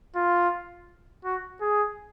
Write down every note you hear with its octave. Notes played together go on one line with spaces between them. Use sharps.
F4
F#4
G#4